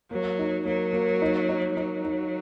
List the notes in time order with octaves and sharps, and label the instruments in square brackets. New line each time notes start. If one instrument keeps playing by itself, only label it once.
[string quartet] F#3 [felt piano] A#3
[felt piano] D#4
[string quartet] F#3 [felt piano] A#3
[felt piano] A#3
D#4
D#4
[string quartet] F#3 [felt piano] D#4
[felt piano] D#4